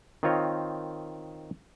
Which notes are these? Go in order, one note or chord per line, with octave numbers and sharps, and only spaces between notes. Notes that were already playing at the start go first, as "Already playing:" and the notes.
D#3 C4 F4 C#5 D#5